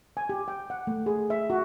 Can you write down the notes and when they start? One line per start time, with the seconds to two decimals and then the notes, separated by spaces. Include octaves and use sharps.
0.17 G#5
0.29 G4
0.48 G5
0.70 F#5
0.87 A3
1.06 G#4
1.30 E5
1.50 F#4